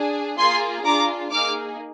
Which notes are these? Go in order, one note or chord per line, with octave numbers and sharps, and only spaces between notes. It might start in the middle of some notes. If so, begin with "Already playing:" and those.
Already playing: D4 G#4
A#3 F4 G#4 G#5 C6
D4 F4 G#4 A#5 D6
A#3 D#4 G#4 D6 F6